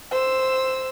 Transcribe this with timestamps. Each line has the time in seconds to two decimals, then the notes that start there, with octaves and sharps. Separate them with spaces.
0.11 C5 E6